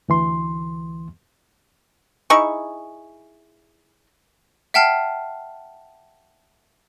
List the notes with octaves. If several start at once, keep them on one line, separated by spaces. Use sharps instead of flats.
D2 E3 C6
D#4 E4 G#4 C#6
E5 F#5 G5 A5 F6 C7